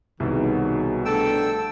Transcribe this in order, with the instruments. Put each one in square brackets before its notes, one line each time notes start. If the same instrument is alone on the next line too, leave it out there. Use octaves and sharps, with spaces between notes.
[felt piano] C2 B2 [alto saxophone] D#3 [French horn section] F#3 F#4 G#4
[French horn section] D3 F3 D4 [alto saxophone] A3 [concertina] A4 G5 E6